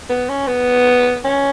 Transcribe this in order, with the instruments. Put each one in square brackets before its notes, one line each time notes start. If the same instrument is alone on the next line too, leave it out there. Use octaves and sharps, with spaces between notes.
[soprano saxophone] B3
C#4
B3
C#4